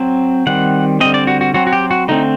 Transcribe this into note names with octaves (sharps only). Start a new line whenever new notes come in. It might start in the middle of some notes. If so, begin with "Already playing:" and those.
Already playing: F#3 C4
D#3 G3 C4 F#5
D3 G3 C4 D#5
D5
F#4
F#4
F#3 C4 F#4
F#4
G4
F#4
D3 A3 C4 D#4